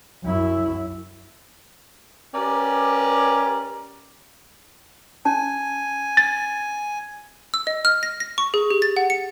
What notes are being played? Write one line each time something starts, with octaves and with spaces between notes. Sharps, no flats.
F#2 E4
C#4 G4 A#4 B4 D5
C#4 G#5 A5
A6
E6
D#5
F6
A#6
A#6
C#6
G#4
G4
A6
F#5
C#7